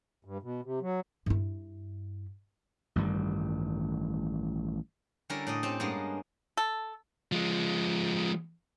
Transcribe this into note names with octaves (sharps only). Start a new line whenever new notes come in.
G2
B2
C3
F#3
G2 E4
A1 G2 D#3 G3
D3 G3 C#4 E4 A#4 D5
A2 D5 D#5
C4 C#4 G4
G2 G#3 A#3 B3
A4
F3 G#3